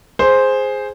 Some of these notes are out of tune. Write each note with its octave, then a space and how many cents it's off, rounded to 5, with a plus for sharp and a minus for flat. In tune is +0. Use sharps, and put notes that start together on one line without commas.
G#4 +0 C5 +0